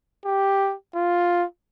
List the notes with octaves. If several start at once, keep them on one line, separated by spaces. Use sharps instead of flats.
G4
F4